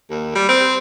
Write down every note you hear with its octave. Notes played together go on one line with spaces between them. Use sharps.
D#2
G3
C4